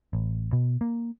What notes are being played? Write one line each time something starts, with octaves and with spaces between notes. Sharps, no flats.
A1
B2
A#3